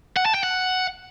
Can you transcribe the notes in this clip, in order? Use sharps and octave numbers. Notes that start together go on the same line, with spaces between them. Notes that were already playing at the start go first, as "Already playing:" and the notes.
F#5
A5
G5
F#5